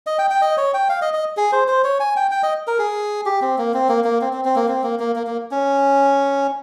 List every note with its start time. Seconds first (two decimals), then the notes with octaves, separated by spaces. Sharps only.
0.07 D#5
0.18 G5
0.30 G5
0.42 D#5
0.57 C#5
0.74 G5
0.89 F5
1.02 D#5
1.14 D#5
1.37 G#4
1.52 C5
1.68 C5
1.84 C#5
2.00 G#5
2.16 G5
2.31 G5
2.43 D#5
2.67 A#4
2.78 G#4
3.26 G4
3.41 C4
3.58 A#3
3.74 C4
3.89 A#3
4.04 A#3
4.21 C4
4.33 C4
4.45 C4
4.56 A#3
4.68 C4
4.83 A#3
4.99 A#3
5.16 A#3
5.27 A#3
5.51 C#4